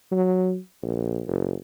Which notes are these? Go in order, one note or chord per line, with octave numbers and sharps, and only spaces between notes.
F#3
A#1
F#1